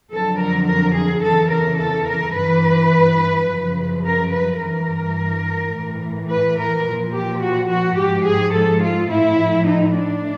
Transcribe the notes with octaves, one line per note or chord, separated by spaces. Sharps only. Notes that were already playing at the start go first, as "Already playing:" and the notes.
F2 D3 F#3 A4
A#4
A#4
G#4
E2 C#3 E3 A4
A#4
A4
A#4
G2 E3 B4
F#2 C#3 F3
A#4
B4
G2 E3 A#4
A2 E3
B4
A#4
A#2 F3
G4
F#4
F#4
G#2 F3 G4
G#4
A4
F4
A2 F3 E4
D#4
D4